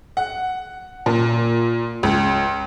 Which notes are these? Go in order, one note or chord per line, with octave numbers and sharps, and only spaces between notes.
F#5
A#2
C#2